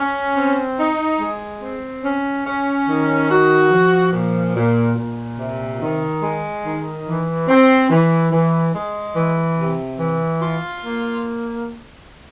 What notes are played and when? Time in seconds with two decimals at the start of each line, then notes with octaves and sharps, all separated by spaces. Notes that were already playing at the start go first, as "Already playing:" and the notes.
Already playing: C#4
0.36 C4
0.78 D#4
1.19 G#3
1.62 C4
2.03 C#4
2.45 C#4
2.88 D#3
3.30 F#4
3.71 F3
4.13 A#2
4.55 A#2
4.96 A#2
5.39 C3
5.80 D#3
6.22 G#3
6.65 D#3
7.07 E3
7.48 C4
7.90 E3
8.32 E3
8.74 G#3
9.16 E3
9.59 C3
9.99 E3
10.42 F4
10.84 A#3